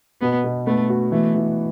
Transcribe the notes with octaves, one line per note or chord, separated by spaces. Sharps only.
B2 B3
B2
A3 B3
F#4
E3 A3
E3